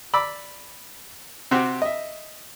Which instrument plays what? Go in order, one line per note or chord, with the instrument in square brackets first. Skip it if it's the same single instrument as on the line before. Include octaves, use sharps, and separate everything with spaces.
[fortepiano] D5 B5 D6 E6
C3 C4 F#4 G4
D#5 E5